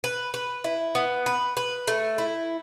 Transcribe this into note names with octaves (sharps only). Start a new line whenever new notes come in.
B4
B4
E4
B3
B4
B4
A3
E4